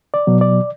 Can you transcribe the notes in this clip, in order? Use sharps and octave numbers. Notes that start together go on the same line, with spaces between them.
D5
B2 F#3
D5